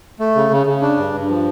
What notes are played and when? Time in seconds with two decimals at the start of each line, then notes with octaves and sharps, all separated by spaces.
0.20 A3
0.35 C#3
0.51 C#3
0.67 C#3
0.82 D4
0.97 G2
1.13 G2
1.29 F3